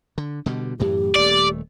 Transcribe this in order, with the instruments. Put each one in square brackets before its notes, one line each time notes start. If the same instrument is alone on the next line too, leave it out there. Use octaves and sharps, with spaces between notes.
[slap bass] D3
B2 D3 G3
[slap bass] F#2 A2 E3 [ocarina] G4
[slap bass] D#1 A3 [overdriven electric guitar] D5